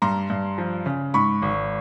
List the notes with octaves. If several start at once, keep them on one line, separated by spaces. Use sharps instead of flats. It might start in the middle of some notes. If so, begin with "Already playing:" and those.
G2 A#5 C6
G2
F3
C#3
G#2 B5 C#6
G#1